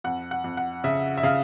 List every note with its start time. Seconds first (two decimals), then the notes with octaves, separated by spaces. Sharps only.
0.04 F2 F#5
0.31 F#5
0.44 F2
0.57 F#5
0.84 C#3 E5
1.18 E5
1.23 C#3 F5